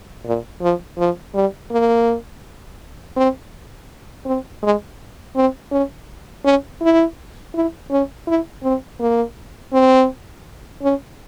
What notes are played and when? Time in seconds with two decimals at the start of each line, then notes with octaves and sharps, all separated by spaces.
0.25 A#2
0.61 F3
0.98 F3
1.34 G3
1.70 A#3
3.16 C4
4.25 C4
4.62 G#3
5.35 C4
5.71 C#4
6.44 C#4
6.81 E4
7.54 E4
7.90 C#4
8.27 E4
8.63 C4
9.00 A#3
9.73 C4
10.82 C#4